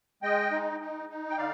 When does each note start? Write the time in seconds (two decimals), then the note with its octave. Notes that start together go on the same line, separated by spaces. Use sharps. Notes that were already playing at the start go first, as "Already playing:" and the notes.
0.23 G#3 D#5 G5
0.51 D#4
0.80 D#4
1.09 D#4
1.30 G5
1.38 D3 D5 F5